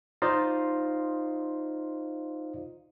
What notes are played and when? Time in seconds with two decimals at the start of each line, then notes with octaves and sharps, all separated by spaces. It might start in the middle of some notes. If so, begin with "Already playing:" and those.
0.22 D#4 F4 C5 D5 D#5 F5